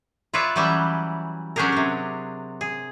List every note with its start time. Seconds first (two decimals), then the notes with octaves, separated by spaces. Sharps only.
0.33 F4 B4 C#5 D5 E5
0.56 E3 F#3 G3 C#4 E5
1.56 F#3 C#4 D4 G4 G#4 A#4
1.72 C3 F#3
2.61 G#4